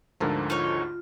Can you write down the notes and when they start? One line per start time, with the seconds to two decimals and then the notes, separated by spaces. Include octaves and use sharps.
0.20 D2 G#2 D3 F3 A4 A#4
0.50 D#4 F4 C#5